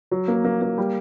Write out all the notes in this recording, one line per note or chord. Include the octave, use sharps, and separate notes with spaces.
F#3
A#3
A#3
A#3
G3